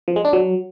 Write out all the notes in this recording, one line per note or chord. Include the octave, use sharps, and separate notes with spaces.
F3
G#3
D4
F#3